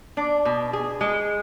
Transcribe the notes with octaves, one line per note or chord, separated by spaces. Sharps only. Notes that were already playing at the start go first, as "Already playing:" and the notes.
D4
B2
G#4
G#3